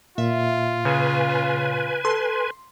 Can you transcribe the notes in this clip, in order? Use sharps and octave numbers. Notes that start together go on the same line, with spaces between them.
A#2 F4 E5
C#3 B4 G#5
A4 C6